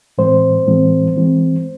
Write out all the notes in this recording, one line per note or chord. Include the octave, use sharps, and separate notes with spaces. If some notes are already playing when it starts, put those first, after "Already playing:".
A2 E3 G#3 C4 C5
A2 E3 G#3 C4
E3 G#3 C4